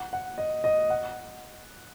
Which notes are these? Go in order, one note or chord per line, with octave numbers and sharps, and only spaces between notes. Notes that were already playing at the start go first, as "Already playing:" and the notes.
Already playing: F#5
F#5
D#5
D#5
F#5